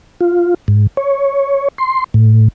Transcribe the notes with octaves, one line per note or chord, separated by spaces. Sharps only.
F4
G#2
C#5
C6
A2